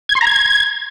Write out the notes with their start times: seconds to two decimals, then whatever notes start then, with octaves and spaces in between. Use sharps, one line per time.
0.09 G#6
0.15 C6
0.21 A#5
0.27 G#6